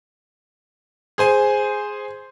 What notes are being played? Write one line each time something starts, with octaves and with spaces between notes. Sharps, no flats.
G#4 C5 G#5